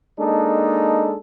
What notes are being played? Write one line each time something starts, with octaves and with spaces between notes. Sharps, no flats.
G#3 A#3 D4 D#4 A4